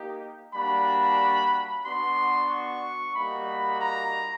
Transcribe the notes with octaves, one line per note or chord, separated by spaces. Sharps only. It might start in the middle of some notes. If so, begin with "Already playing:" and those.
Already playing: A#3 D#4 G4
G3 A#3 D4 F#4 B5
B3 D4 F#4 C6
C#6
G3 A#3 D#4 F#4 B5
A#5